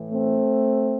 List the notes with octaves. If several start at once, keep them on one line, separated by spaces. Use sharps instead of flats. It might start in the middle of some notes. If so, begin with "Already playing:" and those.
Already playing: A2 E3
A3 C4